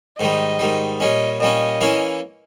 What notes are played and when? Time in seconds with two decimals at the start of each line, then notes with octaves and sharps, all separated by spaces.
0.19 G#2 D#3 G3 D#5
0.59 G#2 D#3 G3
1.00 A#2 G3 C#4 D#5
1.40 A#2 G3 C#4 D#5
1.81 E3 A#3 C#4 E4